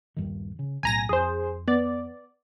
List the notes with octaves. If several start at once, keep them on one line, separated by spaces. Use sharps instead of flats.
D#1 G2 D#3
C#3
B1 A2 G#5 A#5 A#6
F2 G#4 C5
B3 D5